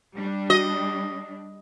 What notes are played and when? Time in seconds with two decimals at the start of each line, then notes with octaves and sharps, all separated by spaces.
0.15 G3 D4
0.50 F#4 D#5